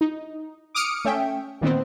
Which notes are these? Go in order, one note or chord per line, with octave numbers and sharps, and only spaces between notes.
D#4
D6 D#6 F6 C#7 D7
A3 C#4 E5 G5
A#2 D#3 B3 C4